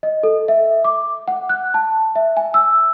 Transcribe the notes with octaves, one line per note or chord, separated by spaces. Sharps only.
D#5
A4
E5
D6
F#5
F#6
A5
E5
G#5
E6